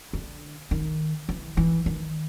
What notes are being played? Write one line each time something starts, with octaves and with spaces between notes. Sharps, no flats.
D3
D#3
E3
E3
D#3